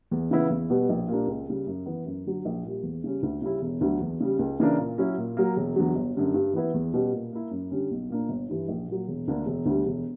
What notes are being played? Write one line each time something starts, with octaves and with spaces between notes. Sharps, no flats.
E2
C#3 E3 B3 E4
E2
B2 G3 B3
A#1
A#2 G3 A#3 D4
C#2
C#3 G3
F#2
E3 B3
F#2
D3 F#3
A#1
A#2 G3
E2
C#3 G3 C#4
D2
C#3 G3 C#4 E4
E1
D2 D3 F#3
E2
C#3 G3
C#2
C#3 E3 A#3 D4
A#2
F#3 C#4 E4
A#2
F#3 A#3
E1
E2 D3 F#3
G1
F#2 D3 G3
G2
E3 B3 E4
E2
B2 G3 C#4
A#2
A#3 E4
F#2
D3 G3 C#4
B1
A#2 A#3 D4
G1
G2 E3
A#1
A#2 F#3
E1
D2 D3 A#3 D4
E1
D2 D3 G3
E1